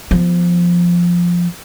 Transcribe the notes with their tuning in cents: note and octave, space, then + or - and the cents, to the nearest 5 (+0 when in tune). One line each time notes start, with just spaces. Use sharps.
F3 +0 B3 +0